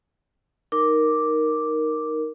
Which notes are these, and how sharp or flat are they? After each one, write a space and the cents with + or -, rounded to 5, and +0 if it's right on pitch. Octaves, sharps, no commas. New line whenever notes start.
D#4 +0 A#4 +0 D6 +0